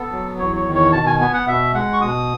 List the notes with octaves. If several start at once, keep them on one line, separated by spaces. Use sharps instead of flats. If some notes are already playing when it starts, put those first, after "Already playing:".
Already playing: B3 A4
F#3
E2 C#5
C#5
D#3
C#5
B2 A5
G#5
B3 G#5
F#5
B2 E5
G#3 F#5
C#6
B2 D#6